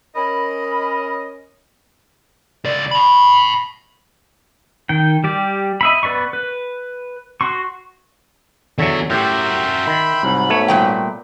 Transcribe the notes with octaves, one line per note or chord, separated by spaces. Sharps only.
C#4 A#4 D#5 B5
C#2 D5
A5 B5
D#3 G5
G3 G4 D5
D#5 E5 B5
B3 B4 D5 B5 C#6
B4
F#4 C6 C#6
E2 D3 F#3 G#4 C#5 E5
A2 F#4 G4 A#4 E5 G5 C6
D#3 B5
C2 G#2 F#3
A3 B3 C#5
A#2 G3 G5